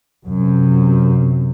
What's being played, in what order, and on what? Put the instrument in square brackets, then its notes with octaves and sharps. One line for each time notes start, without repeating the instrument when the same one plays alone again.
[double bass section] F#2 C3